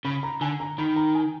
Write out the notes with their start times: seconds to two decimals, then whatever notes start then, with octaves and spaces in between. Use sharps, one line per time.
0.05 C#3 B5
0.23 A#5
0.41 D3 G#5
0.60 A#5
0.78 D#3 B5
0.96 A#5
1.15 G#5